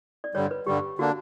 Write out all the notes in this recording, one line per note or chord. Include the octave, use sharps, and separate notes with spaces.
D5
G2 D3 G3 C#5
B4
G2 D3 G3 G4
D3 A#3 D4 F#4